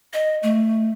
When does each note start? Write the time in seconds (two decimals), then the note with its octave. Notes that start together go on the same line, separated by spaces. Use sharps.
0.13 D#5
0.43 A3